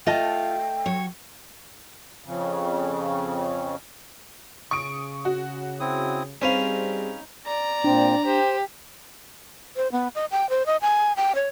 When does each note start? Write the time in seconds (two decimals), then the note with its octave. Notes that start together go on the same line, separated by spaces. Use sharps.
0.06 A3 F4 D#5 G5 A5
0.86 F#3 C#5
2.25 F2 C#3
4.71 C#3 C#6 D#6 D7
5.25 F#4
5.80 C4 E4 D#6
6.42 G3 C4 C#4 D#4 G#4 B4 F5 D#7
7.46 D5 A#5
7.84 A#2 C4 D4
8.25 G4 C5
9.76 C5
9.92 B3
10.15 D#5
10.31 G5
10.50 C5
10.66 D#5
10.82 G#5
11.17 G5
11.35 C#5